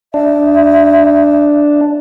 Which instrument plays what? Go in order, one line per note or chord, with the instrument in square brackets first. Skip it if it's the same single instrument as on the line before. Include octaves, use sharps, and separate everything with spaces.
[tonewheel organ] D4 [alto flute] E5